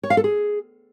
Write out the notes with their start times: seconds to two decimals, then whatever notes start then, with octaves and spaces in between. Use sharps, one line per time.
0.03 C#5
0.10 F5
0.17 A4
0.24 G#4